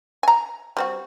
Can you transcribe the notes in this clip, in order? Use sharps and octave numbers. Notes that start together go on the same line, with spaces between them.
G#5 A#5
G3 C4 F#4